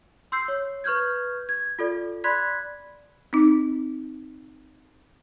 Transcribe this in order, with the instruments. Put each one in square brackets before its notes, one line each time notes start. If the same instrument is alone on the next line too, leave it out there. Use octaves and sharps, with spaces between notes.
[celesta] C6 E6 G6 C7
C#5
B4 C#6 F6 G6 G#6
G#6
F4 A4 D5
D5 B5 C6 F#6 G#6 B6
[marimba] C4 D#4